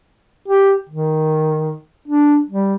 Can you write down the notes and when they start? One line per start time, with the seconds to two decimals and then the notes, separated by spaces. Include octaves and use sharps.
0.48 G4
0.89 D#3
2.08 D4
2.50 G3